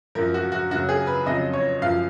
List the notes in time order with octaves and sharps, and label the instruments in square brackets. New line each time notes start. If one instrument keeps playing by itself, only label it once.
[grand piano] F#2 F3 A#4
F#4
F#4
F#2 C#3 F#3 F#4
G#4
B4
F2 C#3 F#3 D#5
C#5
F#2 F3 F5